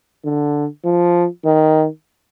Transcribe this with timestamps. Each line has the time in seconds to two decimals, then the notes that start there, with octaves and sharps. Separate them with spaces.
0.25 D3
0.85 F3
1.45 D#3